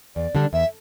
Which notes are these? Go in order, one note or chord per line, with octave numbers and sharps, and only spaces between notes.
E2 D5
D3 G3 D4
E2 E5